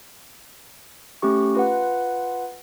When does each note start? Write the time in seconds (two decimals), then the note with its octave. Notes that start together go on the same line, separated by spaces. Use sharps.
1.22 A3 C#4 G4 C#6
1.54 F4 B4 F#5